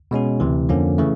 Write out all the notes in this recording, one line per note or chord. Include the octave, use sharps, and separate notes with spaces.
B2 G#3 C#4 F#4
D2 C3 E3
F2 D3 F3 A#3 C#4
C#3 E3 A3